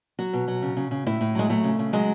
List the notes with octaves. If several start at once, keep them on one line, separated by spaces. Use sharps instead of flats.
F#3 F#4
B2
F#3
C#3
C#3
C#3
A2 E4
A2
F#3 G#3
F#3 A3
C#3
C#3
F#3 G#3